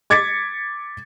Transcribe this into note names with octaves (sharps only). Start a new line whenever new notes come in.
D6 G#6 A6 B6 C#7